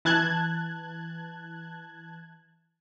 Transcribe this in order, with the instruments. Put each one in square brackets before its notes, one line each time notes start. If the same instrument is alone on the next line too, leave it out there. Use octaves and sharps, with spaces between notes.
[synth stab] E3 A5 F#6 G#6